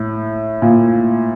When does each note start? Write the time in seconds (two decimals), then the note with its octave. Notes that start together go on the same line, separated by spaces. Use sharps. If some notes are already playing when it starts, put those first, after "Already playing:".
Already playing: A2
0.62 A#2